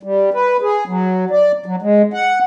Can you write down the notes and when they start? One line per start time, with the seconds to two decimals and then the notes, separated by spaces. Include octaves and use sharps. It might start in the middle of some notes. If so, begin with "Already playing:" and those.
0.03 G3
0.34 B4
0.62 G#4
0.88 F#3
1.30 D5
1.66 F#3
1.82 G#3
2.14 F#5